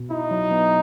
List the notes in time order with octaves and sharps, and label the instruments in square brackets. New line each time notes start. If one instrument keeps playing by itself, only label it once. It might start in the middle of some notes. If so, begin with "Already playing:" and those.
Already playing: [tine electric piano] B2
[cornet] D#4 [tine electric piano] E4
[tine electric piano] F#3
B3